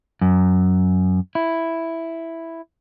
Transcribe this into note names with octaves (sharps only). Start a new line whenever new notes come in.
F#2
E4